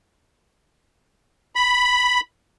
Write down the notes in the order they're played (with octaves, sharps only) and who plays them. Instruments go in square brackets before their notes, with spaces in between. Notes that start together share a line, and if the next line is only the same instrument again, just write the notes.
[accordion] B5